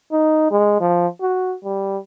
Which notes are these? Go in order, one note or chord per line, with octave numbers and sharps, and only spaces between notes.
D#4
G#3
F3
F#4
G3